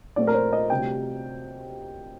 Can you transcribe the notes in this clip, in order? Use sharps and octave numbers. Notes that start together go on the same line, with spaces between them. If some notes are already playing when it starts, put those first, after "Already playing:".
A#1 A#2 A3 C4 D5
A#4
C5
D#5
D2 C3 G3 G5